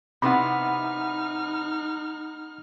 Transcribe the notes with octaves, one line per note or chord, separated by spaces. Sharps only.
C3 B3 D#4 E4 F#5 B5 F6